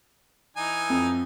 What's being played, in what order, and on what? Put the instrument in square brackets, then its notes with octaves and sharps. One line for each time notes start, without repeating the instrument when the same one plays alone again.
[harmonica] E3 D#4 G#5
[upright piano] F2